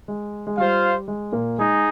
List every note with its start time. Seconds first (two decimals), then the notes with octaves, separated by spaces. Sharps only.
0.08 G#3
0.47 G#3
0.58 G3 F4 C5 F5
1.08 G#3
1.32 A#2 A#3
1.58 G#3 D#4 G#4 D#5